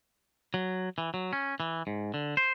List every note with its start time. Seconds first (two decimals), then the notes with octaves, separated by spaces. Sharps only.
0.54 F#3
0.98 E3
1.14 F#3
1.33 C#4
1.60 E3
1.87 G#2
2.14 D3
2.37 C5